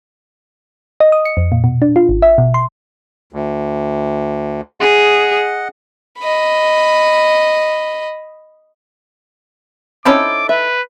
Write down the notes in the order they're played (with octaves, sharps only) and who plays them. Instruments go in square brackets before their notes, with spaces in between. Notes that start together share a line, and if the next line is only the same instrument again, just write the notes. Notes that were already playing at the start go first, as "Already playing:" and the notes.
[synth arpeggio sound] D#5
D#6
C#7
F2
A#2
B2
D4
F4
G#1
E5
B2
C6
[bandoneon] D2
[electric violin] G#4 [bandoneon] D#5 F#5
[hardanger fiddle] D#5 B5
[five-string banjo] C4 C#4 C#5 [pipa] D#4 E4 A4 [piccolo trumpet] D6
[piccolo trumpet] B4 [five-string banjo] E5